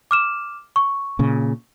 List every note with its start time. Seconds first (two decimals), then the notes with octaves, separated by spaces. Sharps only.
0.11 D6 F6 E7
0.76 C#6
1.19 A#2 C#3